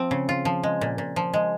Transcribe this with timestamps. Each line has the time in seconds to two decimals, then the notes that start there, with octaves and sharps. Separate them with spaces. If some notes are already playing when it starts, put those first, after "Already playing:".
Already playing: F3 C4
0.11 C#3
0.29 F4
0.45 F3
0.63 G#3
0.81 A#2
0.98 A#2
1.16 F3
1.34 G#3